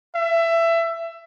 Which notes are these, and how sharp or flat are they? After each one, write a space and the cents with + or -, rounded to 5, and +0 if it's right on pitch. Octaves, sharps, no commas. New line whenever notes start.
E5 +20